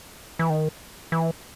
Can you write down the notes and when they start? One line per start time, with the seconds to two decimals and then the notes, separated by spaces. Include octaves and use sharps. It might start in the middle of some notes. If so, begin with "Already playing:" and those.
0.39 E3
0.50 D#3
1.12 E3